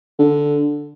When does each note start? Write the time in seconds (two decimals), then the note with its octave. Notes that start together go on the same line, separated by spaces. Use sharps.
0.19 D3